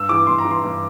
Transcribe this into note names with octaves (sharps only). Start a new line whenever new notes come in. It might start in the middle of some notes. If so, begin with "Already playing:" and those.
Already playing: G2 E6
E3 D6
G2 C6
A#5
E3
C6
G2